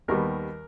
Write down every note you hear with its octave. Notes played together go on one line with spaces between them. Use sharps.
D#2 D#3 G3 B3 A#4